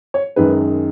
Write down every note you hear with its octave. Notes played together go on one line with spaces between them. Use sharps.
C#5
F#2 D#3 G#3 B4